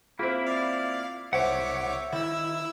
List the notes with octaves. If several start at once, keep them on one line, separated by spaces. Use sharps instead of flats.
A#3 C4 E4 F4 B5
D5 F5
C2 C5 C#5 E5 F#5 D6
D#3 E4 E6